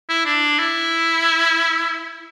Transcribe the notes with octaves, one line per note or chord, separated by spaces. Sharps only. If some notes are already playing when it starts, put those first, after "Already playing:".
E4
D4
E4